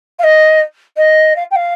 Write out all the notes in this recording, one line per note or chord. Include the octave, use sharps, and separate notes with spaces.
F5
D#5
D#5
F5
G5
F5